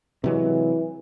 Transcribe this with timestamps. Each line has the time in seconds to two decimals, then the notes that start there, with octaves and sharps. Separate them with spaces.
0.24 C3 E3 F#3 G#3